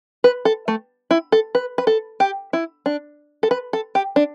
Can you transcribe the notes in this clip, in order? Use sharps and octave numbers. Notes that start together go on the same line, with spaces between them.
B4
A4
A3
E4
A4
B4
B4
A4
G4
E4
D4
A4
B4
A4
G4
D4